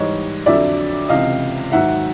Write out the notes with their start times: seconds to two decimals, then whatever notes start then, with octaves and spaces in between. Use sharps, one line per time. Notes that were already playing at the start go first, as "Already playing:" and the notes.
Already playing: G#2 E3 G3 C#5 D#5
0.46 F2 D3 F#3 D5 E5
1.09 C#2 C3 E3 D#5 F5
1.72 G#2 D#3 F#3 E5 F#5